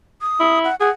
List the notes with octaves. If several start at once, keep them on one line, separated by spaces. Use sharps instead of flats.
D#6
E4
F#5
G#4 F#5